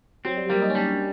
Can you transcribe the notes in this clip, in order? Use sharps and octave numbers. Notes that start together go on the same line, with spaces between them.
F#3 C4
G3
G3 A#3
D#4
C#4
G3 D4